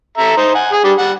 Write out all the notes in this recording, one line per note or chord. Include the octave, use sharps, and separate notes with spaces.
A4 E5 A#5
D#4 C5
F#5 G#5
G#4
G3 D4 G4
G3 F#5